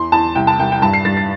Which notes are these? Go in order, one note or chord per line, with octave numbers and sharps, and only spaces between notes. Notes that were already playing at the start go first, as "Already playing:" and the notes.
Already playing: E2 C6
E2 A5
C2 G5
A5
C2 G5
G5
G2 A5
C7
G2 A6
A6